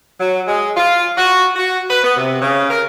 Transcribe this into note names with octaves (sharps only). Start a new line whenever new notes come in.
F#3
G#3
F4
F#4
F#4
B4
B3
C3
C#3
A#4